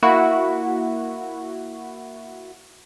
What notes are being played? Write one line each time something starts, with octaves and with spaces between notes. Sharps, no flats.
A#3 E4 F#4